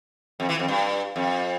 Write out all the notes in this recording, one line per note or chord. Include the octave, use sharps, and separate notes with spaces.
F2
E3
F2
G2
F2